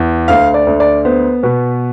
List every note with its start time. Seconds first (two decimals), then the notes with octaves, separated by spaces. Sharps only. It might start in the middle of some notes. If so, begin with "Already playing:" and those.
Already playing: E2
0.28 D2 F5
0.54 D5
0.67 D2
0.80 D5
1.05 B3 C5
1.43 B2 B4